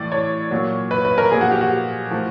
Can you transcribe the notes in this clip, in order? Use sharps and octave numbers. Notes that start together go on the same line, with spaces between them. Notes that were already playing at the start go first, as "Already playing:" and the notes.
Already playing: A2 E3 D5
C#5
A#2 F#3
B4
B4
A#4
A#2 F3 G#4
F#4
G4
F#4
A2 F3